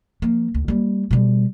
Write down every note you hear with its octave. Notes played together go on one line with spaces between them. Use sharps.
F3 A#3
D2
G3 A#3
B2 G3